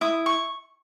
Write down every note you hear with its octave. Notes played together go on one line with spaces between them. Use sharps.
E4 D#6
C#6